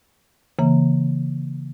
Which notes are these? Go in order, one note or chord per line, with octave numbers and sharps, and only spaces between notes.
C#3 E3 A#3